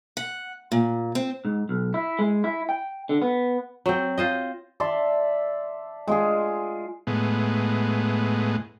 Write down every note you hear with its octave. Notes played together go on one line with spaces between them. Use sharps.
F#5
A#2
C4
G#2
B1
E4
G#3
E4
G5
D3
B3
F#3 C4
F4 C5 D#5
D5 E5 A5 C6
G#3 F4 G#4
A2 G#3 B3